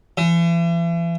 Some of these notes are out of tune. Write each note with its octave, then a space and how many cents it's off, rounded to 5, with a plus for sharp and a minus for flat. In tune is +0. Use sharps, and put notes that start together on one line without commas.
E3 +40